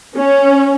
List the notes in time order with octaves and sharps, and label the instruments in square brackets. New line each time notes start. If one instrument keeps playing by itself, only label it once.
[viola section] C#4